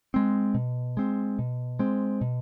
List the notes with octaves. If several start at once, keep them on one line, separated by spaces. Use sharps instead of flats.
G#3 C4
B2
G#3 C4
B2
G#3 C4
B2